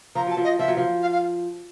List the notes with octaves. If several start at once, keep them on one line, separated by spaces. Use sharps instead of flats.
F3 A#5
F#3 A5
F3
D#5
F3 E5
F#3
F3
F5
F5